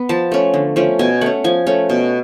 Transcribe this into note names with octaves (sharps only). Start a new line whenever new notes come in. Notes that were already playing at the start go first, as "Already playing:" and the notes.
Already playing: B3
F3 A5
A3 C#4
D3
F3 A3 C#4
B2 G#5
A3 C#4 F#5
F3 G#5
A3 C#4
B2